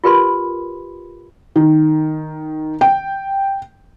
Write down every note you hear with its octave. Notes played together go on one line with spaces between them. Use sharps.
F4 G4 A#4 B4 B5 C6
D#3
G5